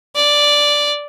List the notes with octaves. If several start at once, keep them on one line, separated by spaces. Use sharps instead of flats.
D5